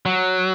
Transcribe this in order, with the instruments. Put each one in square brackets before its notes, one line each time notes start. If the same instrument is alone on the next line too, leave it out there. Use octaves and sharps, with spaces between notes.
[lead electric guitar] F#3